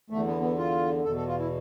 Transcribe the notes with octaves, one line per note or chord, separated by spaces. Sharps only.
E2 D3 A3
B3
B3
F4
E2 B2 A4
A4
F4
E4